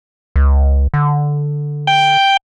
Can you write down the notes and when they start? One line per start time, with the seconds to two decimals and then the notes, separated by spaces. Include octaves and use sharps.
0.36 C#2
0.94 D3
1.87 G5